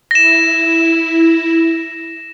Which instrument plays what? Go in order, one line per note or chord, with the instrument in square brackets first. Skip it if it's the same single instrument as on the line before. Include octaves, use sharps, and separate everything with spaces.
[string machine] E4 [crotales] A#6 E7